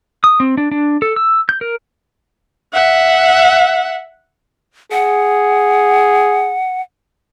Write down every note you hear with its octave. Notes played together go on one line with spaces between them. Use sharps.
D#6
C4
D4
D4
A4
E6
G6
A#4
E5 F#5
G#4 F#5